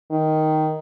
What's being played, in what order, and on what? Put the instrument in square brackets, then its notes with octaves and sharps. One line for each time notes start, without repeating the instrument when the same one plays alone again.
[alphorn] D#3